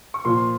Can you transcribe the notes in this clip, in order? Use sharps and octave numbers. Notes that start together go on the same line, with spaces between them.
C#6
A#2 F3 C6